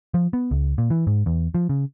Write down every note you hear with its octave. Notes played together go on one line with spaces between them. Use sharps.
F3
B3
C#2
A#2
E3
G#2
E2
F3
C#3